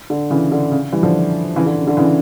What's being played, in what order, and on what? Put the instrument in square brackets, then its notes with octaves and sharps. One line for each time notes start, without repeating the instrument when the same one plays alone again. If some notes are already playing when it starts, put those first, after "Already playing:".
[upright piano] D3
C#3 E3
D3
C#3
E3 G3
D3 F3
C#3 E3
D3
C#3
D3
C#3 E3